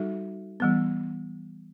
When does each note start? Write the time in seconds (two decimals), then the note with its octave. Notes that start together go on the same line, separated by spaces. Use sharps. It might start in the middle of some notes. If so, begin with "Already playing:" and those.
Already playing: G3 D#4 F#4 A4 E5
0.60 E3 G3 B3